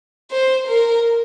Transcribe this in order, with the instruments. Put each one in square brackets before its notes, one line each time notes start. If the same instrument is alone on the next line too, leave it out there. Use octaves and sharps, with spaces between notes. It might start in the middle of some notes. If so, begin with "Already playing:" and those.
[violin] C5
A#4